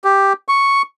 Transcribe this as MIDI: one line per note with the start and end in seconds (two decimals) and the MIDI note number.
0.04 0.33 67
0.48 0.82 85